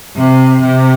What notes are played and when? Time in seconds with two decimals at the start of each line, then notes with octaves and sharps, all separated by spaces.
0.16 C3
0.61 C3